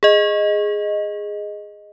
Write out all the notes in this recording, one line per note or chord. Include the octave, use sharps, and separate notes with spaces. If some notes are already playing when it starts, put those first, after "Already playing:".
G#4 D#5